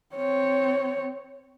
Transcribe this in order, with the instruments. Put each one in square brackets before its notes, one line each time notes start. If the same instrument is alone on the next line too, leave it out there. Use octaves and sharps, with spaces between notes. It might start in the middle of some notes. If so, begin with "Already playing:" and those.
[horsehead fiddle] C4 C#5